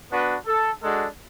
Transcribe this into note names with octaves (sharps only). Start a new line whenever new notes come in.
B3 D4 F#4 B4
A4
G#3 D4 F#4 A4